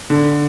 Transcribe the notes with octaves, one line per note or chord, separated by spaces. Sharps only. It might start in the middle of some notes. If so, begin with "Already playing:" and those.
D3